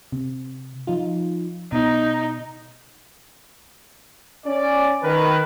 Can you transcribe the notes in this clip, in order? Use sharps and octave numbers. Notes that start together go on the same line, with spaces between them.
C3
F3 D#4 F4
B2 D#4
C#4 D5
D#3 A#4 B4